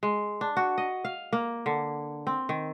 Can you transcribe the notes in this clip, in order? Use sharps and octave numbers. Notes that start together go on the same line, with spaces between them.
G#3
D4
F#4
D#5
F5
A#3
D3
C4
D#3